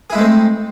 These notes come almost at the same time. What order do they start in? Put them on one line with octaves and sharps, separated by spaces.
G#4 E4 G#3 A3 C4